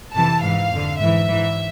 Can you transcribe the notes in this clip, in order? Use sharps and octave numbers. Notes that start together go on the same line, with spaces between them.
F2 C3 E3 A5
G#2 E3 F5
F2 D3
G#2 E3 E5
G#2 E3